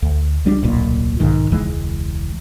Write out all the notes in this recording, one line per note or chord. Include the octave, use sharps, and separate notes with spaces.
D2
C#2 G3 C#4 D4
D1 B1 A#2
B1 G#2 D#3
E1 C#2 E3 G#3